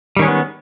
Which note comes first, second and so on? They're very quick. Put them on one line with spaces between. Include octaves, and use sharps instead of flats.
G3 D#3 C#4 G#3 B3